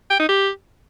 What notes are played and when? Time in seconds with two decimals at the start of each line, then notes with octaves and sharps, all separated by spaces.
0.10 G5
0.20 D#4
0.29 G4